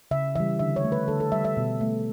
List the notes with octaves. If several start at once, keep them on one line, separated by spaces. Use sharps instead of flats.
C#3 E5
E3 G3 E5
D3 E5
C#5
A3
B4
D3 A4
A4
G3 E5
E5
B2
A3